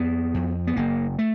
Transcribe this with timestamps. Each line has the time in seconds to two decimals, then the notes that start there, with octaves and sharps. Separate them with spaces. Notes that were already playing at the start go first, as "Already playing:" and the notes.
Already playing: F2 B3
0.34 F2
0.67 B3
0.76 F#1 A#3
1.19 A3